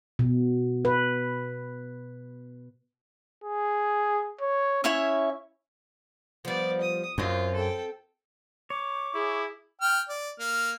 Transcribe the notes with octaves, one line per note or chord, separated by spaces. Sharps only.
B2
B4
G#4
C#5
C#4 E4 C#5 E5
F3 G3 B3 D5
D#6
F#2 C4 F4 D#5
A4 G5
C#5 D6
E4 G#4
G5 F6
D5
A#3 F6